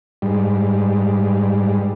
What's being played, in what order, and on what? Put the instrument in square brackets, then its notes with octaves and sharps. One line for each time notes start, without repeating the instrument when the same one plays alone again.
[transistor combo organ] G#2 G3